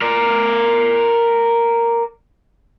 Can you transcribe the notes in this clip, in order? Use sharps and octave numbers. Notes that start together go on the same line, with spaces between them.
A#4 D5